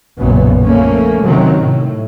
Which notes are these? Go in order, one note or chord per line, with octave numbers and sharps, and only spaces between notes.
F#1 B1 F#2 A#2 B3
F3 A3 A#3 C#4
C3 D#3 F#3
A2